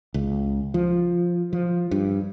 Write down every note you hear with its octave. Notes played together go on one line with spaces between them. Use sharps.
C#2
F3
F3
G2